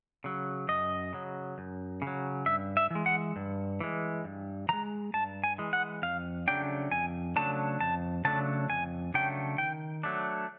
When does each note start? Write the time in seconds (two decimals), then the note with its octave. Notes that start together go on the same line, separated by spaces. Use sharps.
0.24 C#3 F#3
0.68 F#2 D#5
1.13 C#3 F#3
1.58 F#2
2.02 C#3
2.07 F#3
2.46 G2 E5
2.77 E5
2.91 E3 G#3
3.06 F#5
3.36 G2
3.80 E3 G#3
4.24 G2
4.69 E3 G#3 A#5
5.14 G2 A5
5.44 G#5
5.58 E3 G#3
5.73 F#5
6.02 F2 F5
6.48 C#3 F#3 A3 D4 G5
6.91 F2 G#5
7.36 C#3 F#3 A3 D4 A5
7.80 F2 A5
8.25 C#3 F#3 A3 D4 A5
8.70 F2 G#5
9.14 C#3 F#3 A3 D4 G5
9.58 D#3 G5
10.03 F#3 A3 D4